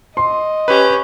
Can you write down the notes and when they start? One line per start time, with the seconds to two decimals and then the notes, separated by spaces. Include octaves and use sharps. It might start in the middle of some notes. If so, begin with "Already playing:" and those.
0.17 D#5 C6
0.68 C#4 G4 B4